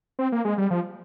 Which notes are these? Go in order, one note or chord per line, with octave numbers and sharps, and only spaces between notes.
C4
A#3
G#3
G3
F3